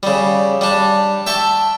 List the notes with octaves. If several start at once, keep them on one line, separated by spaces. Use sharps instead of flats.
C#3 G3
G3 D4
E5 G5 A5 C#6